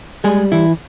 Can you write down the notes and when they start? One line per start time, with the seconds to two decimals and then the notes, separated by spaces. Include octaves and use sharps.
0.24 G3 G#3 G#4
0.52 E3 E4